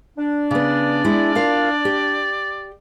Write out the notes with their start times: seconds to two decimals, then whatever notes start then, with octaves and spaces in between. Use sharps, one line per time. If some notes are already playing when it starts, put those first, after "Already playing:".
0.18 D4
0.51 C#3 B3 D5
1.05 G#3 E4
1.35 F4 A#4 F5
1.85 G4